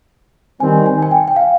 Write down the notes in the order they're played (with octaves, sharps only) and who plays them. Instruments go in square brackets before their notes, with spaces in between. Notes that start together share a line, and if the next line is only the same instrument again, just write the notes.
[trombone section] D#3 G3 C4 [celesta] G#5
[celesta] G#5
G#5
G5
G5
F5